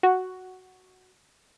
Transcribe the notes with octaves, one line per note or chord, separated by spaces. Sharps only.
F#4